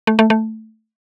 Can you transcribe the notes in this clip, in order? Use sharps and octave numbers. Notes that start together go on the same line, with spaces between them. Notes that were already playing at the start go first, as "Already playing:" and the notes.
A3
A3
A3